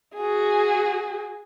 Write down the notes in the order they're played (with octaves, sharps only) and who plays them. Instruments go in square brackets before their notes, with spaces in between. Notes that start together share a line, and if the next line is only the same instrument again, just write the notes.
[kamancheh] F#4 G#4